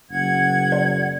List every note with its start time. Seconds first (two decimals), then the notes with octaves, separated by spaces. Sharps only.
0.10 F#1 F#5 G#6
0.72 D5